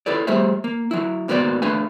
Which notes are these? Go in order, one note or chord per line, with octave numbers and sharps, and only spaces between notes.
E4 A4 B4 D5
G3 A3 G#4 C5 E5
A#3
F#3 E4
G#2 A#3 B3 F#4 C5 D5
A3 D4 B4 F5 G#5